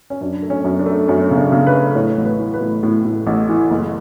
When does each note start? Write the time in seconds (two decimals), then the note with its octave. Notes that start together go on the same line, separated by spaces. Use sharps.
0.10 C#4
0.21 F#2 D4
0.42 A3
0.50 C#4
0.64 F#2
0.79 D4
0.86 A3
1.08 F#2 C#4
1.31 C#3
1.38 D4
1.52 C#3
1.67 B4
1.74 A3
1.95 A2 C#5
2.18 A1
2.25 B4
2.39 E3
2.54 B4
2.61 A2
2.83 A2
3.05 A2
3.27 A1
3.49 E3
3.70 F#1